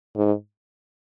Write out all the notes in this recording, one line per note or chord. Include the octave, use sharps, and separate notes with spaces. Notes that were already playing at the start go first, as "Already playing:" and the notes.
G#2